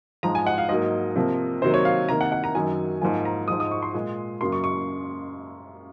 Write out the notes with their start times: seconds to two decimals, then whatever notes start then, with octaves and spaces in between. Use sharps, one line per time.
0.23 G#2 F3 G#3 A#5
0.35 G#5
0.47 F#5
0.58 F5
0.69 G#2 F#3 A#3 D#5
1.16 C3 F3 A#3
1.62 C3 D#3 F#3 A#3 C5
1.74 C#5
1.85 F5
2.09 C3 D#3 A#3 A#5
2.21 F#5
2.32 F#5
2.44 A#5
2.55 F#2 D#3 F#3 G#5
3.01 G#2 F3 A#3 G#5
3.25 A#5
3.48 G#2 F3 G#3 D#6
3.60 D#6
3.71 C#6
3.82 C6
3.94 A#2 G#3
4.41 F#2 C#3 F#3 A#3 C6
4.52 C#6
4.64 C#6